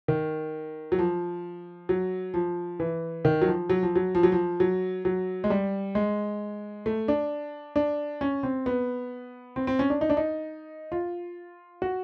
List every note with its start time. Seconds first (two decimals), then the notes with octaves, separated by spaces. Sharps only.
0.08 D#3
0.92 F#3
0.99 F3
1.89 F#3
2.34 F3
2.80 E3
3.25 D#3
3.42 F#3
3.47 F3
3.70 F#3
3.83 F3
3.96 F#3
4.15 F3
4.23 F#3
4.32 F3
4.60 F#3
5.05 F#3
5.44 G#3
5.50 G3
5.95 G#3
6.86 A3
7.08 D4
7.76 D4
8.21 C#4
8.43 C4
8.66 B3
9.56 C4
9.67 C4
9.79 C#4
9.90 D4
10.01 D#4
10.10 D4
10.17 D#4
10.92 F4
11.82 F#4